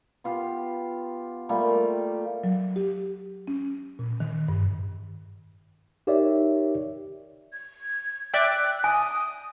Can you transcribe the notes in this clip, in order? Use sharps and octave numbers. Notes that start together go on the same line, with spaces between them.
B3 F4 G4
G3 A3 A#3 F4
F#3
G4
C#4
A#2
D#3
G2
D#4 G4 A#4 C#5 D5 E5
G#6
D5 E5 G5 F#6
G#5 D#6